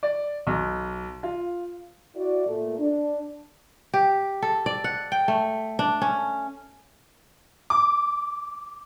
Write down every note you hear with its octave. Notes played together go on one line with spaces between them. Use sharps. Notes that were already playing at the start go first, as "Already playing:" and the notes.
D5
B1
F4
E4 F#4 D5
A#2 A3
D4
G4
A4
D5
F#5
G5
A3
D4
C#4
D6